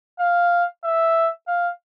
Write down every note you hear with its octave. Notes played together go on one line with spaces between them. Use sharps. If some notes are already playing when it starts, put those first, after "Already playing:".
F5
E5
F5